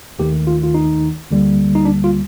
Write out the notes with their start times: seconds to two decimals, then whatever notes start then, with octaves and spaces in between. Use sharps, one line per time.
0.19 D#2 D#3 A3 G4
0.47 F4
0.64 F4
0.75 D#4
1.31 D2 D3 G3 A#3
1.75 D#4
1.85 D4
2.04 F4